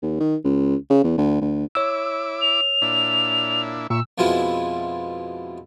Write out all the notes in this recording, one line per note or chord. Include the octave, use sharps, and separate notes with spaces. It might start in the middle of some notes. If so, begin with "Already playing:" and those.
D#2
D#3
C#2
C#3
E2
D2
D2
E4 C#5 D6 E6
F7
A#2 D4 E4
A#2 E5 C#6 E6
F2 B2 G#3 E4 F4